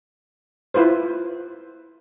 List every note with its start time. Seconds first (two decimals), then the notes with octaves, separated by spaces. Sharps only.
0.74 E4 F4 B4 C5